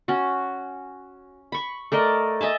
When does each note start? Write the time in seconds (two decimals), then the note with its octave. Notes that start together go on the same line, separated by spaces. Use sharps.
0.08 C#4 F#4
1.52 B5 C#6
1.92 A3 A#4 D5 D#5
2.41 D#5 E5 G#5 A5